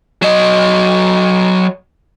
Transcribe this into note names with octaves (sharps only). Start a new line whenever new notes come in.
F#3 D#5